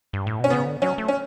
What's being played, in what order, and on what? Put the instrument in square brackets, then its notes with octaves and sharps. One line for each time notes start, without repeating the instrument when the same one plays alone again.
[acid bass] G2
A2
[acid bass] B2 [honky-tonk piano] C#4
[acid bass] C#3 [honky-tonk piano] B3
[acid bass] D3
[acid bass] F#3 [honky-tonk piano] C#4
[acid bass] A3
[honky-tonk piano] C#4